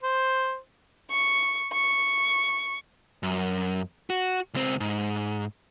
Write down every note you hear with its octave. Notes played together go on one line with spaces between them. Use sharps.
C5
C#6
C#6
F#2
F#4
C#2 C4
G#2